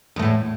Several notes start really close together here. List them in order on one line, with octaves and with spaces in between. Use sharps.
E2 A3 A2